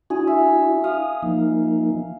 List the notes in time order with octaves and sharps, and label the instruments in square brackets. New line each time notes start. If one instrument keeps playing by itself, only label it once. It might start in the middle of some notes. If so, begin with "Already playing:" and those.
[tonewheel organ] D4 E4 F#4 [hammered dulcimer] G#4
[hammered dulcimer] E5
[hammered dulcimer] F5 [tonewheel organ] D#6
[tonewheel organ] F3 A#3 D#4